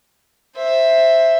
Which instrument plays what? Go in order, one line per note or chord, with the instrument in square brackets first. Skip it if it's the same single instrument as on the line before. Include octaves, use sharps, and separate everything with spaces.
[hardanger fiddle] C5 E5